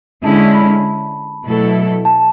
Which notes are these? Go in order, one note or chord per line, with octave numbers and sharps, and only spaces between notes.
D3 G#3 C#4 E4 A5
B5
B2 F#3 A3 E4 A4
A5